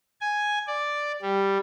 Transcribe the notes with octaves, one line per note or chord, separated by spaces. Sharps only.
G#5
D5
G3